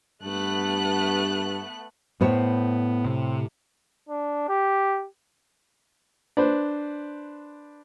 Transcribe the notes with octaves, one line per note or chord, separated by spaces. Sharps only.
G2 A3 B3 F#6
A2 B3 C5 C#5
C3
D4
G4
D4 B4 C5